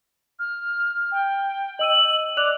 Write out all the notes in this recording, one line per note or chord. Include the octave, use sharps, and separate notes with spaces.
F6
G5
D#5 E6 D#7 F#7
D5 D6 F#6 F7